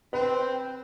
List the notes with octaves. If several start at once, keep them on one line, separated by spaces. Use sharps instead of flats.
C4 B4